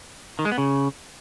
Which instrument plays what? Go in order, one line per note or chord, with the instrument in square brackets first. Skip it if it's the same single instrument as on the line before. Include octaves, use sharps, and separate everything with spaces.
[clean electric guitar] D#3
G#3
B3
C#3